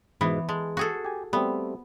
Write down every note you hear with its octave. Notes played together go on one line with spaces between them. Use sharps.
G#2 B2 E3 B3
G#3 A5
F#4 G#4 A4
G4 G#5
G3 A3 B3 C4